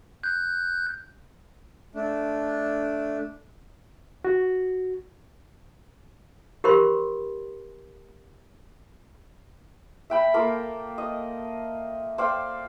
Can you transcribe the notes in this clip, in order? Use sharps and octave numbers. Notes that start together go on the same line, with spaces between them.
F#6 G6
A3 D4
F#4
G4 A#4 C5 B5 C6
E5 G5 B5
A3 A#3 F4 A#4
D#5
C5 D5 F5 G5